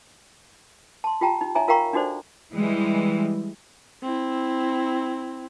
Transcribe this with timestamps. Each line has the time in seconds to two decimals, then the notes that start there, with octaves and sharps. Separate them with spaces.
1.04 A5 C6
1.21 F4 G4 G5 A5 A#5
1.41 D#4
1.55 D#4 C#5 E5 G#5 A#5
1.68 F4 A#4 F5 G5 A#5 C#6
1.93 D4 D#4 F#4 A4 C5 D5
2.53 E3 G3 G#3
4.03 C4 E4